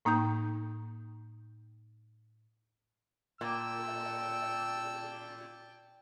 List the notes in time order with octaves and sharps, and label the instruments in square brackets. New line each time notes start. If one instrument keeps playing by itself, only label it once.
[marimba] A2 A#3 D#4 G5 G6
[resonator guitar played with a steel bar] A#2 [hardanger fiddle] G5 A5 [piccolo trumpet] E6